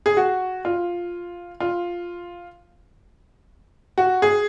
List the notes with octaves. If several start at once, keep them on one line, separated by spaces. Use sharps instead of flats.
G#4
F#4
F4
F4
F#4
G#4